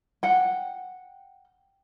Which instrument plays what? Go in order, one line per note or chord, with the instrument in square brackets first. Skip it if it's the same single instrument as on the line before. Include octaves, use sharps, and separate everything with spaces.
[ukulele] F#5 G5